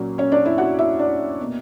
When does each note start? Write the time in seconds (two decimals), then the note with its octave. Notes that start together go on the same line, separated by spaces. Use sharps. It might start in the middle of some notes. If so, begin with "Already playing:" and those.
Already playing: A#2 F#3 A#3 C#4
0.18 C#4 C#5
0.32 D4 D5
0.45 E4 E5
0.58 F#4 F#5
0.78 E4 E5
0.99 D4 D5
1.40 B2 A#3